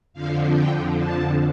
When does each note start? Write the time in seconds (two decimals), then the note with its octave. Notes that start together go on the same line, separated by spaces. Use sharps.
0.13 F2 D3 F3 F5
0.54 G5
0.96 A5